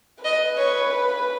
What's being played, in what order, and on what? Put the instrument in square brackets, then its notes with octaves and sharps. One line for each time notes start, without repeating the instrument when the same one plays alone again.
[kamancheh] B4 [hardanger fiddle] D#5
[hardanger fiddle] C#5